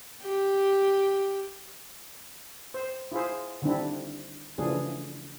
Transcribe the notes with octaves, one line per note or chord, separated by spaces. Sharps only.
G4
C5
E4 F4 G#4 C5
D3 D#3 G3 C4 D4 E4
C#3 E3 F3 A3 D4 G#4